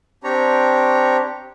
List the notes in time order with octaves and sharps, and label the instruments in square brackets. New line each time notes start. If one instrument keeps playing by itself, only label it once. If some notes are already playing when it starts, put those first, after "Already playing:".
[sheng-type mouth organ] C4 D4 G4 C#5 A#5